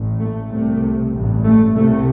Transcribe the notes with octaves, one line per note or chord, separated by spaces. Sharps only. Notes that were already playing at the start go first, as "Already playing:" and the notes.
Already playing: A1 A2
A3
C2 C3 A3
A1 G2
A3
C2 C3 A3